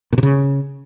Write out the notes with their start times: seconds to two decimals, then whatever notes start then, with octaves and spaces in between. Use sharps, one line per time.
0.13 A#2
0.18 C3
0.23 C#3